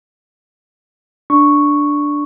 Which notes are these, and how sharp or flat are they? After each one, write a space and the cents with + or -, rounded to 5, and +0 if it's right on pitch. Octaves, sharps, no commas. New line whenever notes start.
D4 +0 C#6 +0